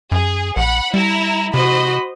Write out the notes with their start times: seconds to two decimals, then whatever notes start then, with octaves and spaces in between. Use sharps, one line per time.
0.12 F#2 G#4
0.57 A#1 F#5 B5
0.94 G3 E4 A#5
1.54 C3 F#4 C5 D#5 B5